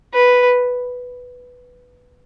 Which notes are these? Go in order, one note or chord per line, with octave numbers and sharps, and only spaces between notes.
B4